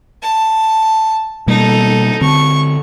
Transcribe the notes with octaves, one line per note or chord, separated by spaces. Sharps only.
A5
B2 G3 A#3 D#4 A4
D3 C4 C#6